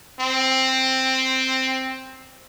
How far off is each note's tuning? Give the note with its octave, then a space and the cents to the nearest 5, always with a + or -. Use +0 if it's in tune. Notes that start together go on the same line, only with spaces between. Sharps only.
C4 +5